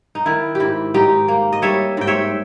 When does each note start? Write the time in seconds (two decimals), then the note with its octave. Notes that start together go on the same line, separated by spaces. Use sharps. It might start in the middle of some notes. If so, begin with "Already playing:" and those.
0.15 D#4
0.26 D#3 E4
0.55 G4
0.60 G#2 E4
0.94 G#2 D#4 G4
1.28 A#3
1.53 D#5
1.62 G3 C#5 E5
1.97 G#2 G5
2.07 C#5 E5